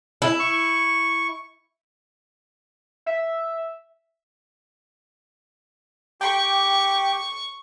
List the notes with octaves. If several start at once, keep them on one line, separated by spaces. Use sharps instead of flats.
E4
C#6
E5
G4 G5 C#6 D6